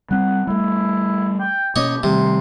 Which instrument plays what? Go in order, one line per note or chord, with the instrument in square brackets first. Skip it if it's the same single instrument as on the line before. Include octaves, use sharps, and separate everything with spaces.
[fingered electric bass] G3 C4 [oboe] F#5
[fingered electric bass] G3 A3 [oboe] E4
[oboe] G5
[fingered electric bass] B2 A#3 C#4 [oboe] G4 [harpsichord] C#5 D#5
[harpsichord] C3 [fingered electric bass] D#3 G3 A3 [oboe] C6